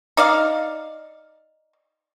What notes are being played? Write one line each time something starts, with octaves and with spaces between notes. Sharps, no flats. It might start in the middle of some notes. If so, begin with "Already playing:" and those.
D#4 D5 F5